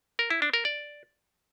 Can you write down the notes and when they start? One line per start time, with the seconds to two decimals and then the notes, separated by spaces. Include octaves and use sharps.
0.19 A#4
0.30 E4
0.42 D4
0.53 A#4
0.65 D5